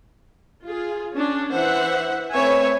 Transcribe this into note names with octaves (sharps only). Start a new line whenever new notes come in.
F4 G#4
C#4 D4
E3 C5 E5 F#5
A3 C4 B4 C#5 E5 G#5